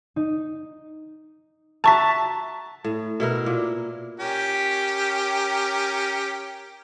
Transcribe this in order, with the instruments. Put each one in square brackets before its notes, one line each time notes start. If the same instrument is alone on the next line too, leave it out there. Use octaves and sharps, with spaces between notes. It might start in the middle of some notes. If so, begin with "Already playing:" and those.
[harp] D#4
[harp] F#4 E5 [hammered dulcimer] A5 [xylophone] A#5 C#6 B6
[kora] A2
B2 E4 A#4
A#2
[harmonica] C#4 G4 A#4